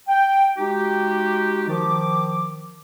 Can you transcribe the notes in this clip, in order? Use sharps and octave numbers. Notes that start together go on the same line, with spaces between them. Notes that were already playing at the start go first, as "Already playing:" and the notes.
G5
G#3 D#4 F#4 G4
D#3 F3 D6